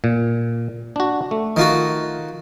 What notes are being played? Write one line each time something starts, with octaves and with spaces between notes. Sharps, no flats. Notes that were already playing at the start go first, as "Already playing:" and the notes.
A#2
D4 F#4
A3
D#3 F4 F#4